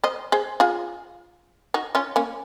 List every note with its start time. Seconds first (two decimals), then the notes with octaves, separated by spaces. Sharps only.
0.04 C5 D#5
0.32 G#4 C5
0.60 F4 G#4
1.74 D#4 F#4
1.95 C#4 F4
2.16 A#3 C#4